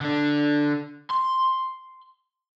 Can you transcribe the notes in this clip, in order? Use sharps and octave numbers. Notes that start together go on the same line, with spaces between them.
D3 D4
C6